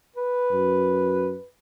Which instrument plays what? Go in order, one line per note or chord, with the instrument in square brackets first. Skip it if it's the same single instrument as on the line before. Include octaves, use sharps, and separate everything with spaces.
[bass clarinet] B4
[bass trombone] F#2